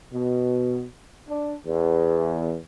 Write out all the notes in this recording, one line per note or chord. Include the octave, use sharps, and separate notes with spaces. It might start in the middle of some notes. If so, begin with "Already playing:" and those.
B2
D4
E2